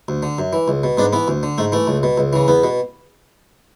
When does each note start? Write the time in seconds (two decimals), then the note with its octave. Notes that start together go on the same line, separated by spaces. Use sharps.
0.08 D2
0.23 D3
0.38 F#2
0.53 E3
0.68 C#2
0.83 B2
0.97 G#2 B3 D4
1.13 E3 B3
1.28 D2
1.43 D3
1.58 G#2 A3
1.72 E3 A3
1.87 C#2
2.03 B2
2.18 C#2
2.33 C#3 E3
2.48 E2 B3
2.64 B2